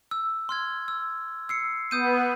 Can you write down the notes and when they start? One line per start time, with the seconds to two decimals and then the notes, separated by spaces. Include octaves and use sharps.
0.11 E6
0.49 C6 F6 G#6
0.88 E6
1.49 E6 C7 C#7
1.91 B3 D#6 G6 D#7